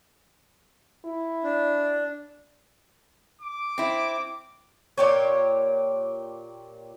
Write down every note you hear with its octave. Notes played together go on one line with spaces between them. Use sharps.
E4
D4
D6
C4 E4
A#2 G4 C#5